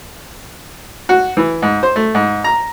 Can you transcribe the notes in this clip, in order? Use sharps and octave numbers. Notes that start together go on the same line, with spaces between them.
F#4
E3
G#2
C5
A3
G#2
A#5